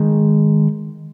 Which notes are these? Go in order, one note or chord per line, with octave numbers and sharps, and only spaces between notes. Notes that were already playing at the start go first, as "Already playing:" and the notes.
Already playing: D#3 G#3 D#4